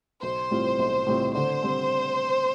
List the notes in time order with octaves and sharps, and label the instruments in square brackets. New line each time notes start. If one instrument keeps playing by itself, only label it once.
[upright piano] B1 [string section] C5
[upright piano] A2 G3 C4 F4
B1
A2 G3 C4 F4
[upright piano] D3 [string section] C5
[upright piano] G3 C4